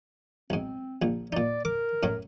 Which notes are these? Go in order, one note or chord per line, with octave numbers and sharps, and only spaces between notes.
B1 G#2 C4
A#1 A#2
A#2 D#4 D5
A#4 D6
F#2 A2 F#3